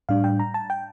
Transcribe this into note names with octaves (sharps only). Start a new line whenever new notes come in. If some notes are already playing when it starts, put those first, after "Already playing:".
A2 G3 D4 F5
G5
A#5
A5
G5